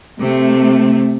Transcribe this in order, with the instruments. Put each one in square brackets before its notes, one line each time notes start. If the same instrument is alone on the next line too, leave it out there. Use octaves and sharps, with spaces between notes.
[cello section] C3 A3